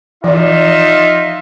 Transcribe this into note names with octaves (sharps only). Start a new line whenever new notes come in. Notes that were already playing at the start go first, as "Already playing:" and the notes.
E3 F3 D#4 F4 E5